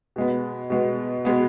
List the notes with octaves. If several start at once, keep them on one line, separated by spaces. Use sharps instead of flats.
B2 G#3 B3
B2 G#3 B3
B2 G#3 B3